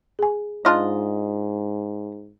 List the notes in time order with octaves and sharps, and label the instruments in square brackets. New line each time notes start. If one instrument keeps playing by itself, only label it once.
[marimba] G#4 G#5
[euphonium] G#2 [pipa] D4 F4 D#5